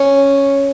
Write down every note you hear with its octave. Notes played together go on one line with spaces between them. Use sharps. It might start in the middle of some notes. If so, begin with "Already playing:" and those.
Already playing: C#4